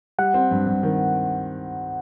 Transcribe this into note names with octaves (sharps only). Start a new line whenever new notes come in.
G3 F#5
C4
G2
G2
D#3